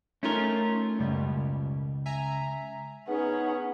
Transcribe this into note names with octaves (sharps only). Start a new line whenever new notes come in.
A3 C#4 D#4 F4 A#4
C#2 F#2 B2 G3
E5 G#5 A#5
B3 C#4 D#4 G#4 F#5